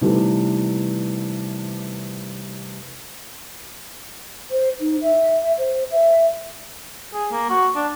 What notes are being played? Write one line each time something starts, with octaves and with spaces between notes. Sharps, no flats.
C3 D#3 E3 G3 A3 B3
C5
D#4
E5
E5
C5
E5
G#4
A#3
F#4
D4